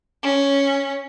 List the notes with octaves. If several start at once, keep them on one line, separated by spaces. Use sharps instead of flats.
C#4